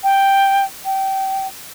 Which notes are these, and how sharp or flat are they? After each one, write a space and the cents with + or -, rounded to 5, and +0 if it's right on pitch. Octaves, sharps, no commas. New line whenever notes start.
G5 +0
G5 -25